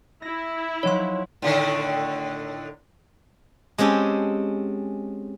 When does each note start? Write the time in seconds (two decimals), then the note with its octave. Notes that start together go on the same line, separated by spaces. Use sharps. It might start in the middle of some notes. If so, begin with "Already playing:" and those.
0.22 E4 A#6
0.83 F3 F#3 D#4 C#5 C6
1.42 A2 D3 D#3
3.78 G#3 C4 C#4 G4 A4